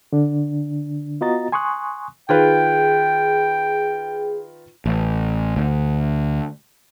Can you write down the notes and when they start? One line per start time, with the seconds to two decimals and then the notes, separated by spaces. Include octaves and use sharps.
0.13 D3 D4
1.21 B3 F4 F#4 D#5 A#5 A6
1.52 G#5 C6 C#6 D#6 F#6
2.29 D#3 F4 G#4 B4 G5
4.86 A1
5.56 D2